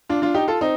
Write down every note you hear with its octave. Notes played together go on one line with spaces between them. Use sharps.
D4 F4
D4 F4
D#4 G4
F4 A4
C4 D#4